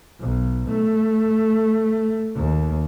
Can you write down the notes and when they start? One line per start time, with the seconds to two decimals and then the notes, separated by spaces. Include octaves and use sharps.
0.21 B1
0.69 A3
2.35 D#2